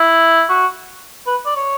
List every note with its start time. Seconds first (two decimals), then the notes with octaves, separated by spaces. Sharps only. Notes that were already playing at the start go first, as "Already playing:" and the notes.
Already playing: E4
0.49 F#4
1.27 B4
1.46 D5
1.56 C#5